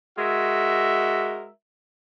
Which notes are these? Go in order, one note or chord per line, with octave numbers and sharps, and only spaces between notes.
G#3 F#4 A#4 E5